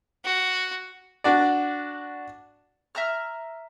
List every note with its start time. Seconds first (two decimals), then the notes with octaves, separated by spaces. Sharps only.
0.24 F#4
1.24 D4 F#4 D5
2.95 E5 A#5 F6